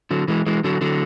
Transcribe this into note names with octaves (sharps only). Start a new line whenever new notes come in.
D3 F#3
E3 G#3
E3 G#3
D3 F#3
D3 F#3